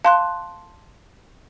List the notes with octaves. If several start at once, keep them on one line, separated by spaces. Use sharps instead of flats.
F5 A5 C6 F#6